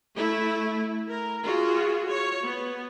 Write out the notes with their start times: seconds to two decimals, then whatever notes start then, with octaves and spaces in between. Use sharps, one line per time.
0.15 A3 E4
1.08 A#4
1.43 F4 F#4 G#4
2.08 C#5
2.43 B3